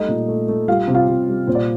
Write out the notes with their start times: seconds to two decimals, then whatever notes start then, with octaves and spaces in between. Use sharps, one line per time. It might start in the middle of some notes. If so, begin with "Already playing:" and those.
Already playing: G3 A3 D#4 D#5
0.08 A#2
0.28 A3
0.48 A3
0.68 G3 F4 F5
0.87 C3
0.95 F4 F5
1.08 C3
1.28 G3
1.47 A#2 C5
1.55 D5